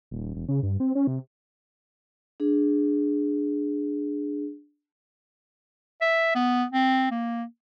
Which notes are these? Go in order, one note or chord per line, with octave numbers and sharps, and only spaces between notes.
D#1
E1
C#3
G2
C4
C#4
C3
D4 G#4
E5
B3
C4
A#3